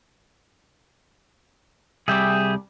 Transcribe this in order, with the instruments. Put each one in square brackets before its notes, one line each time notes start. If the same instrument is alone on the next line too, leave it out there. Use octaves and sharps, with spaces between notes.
[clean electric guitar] C2 G3 D5 [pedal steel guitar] G#4 E5 G5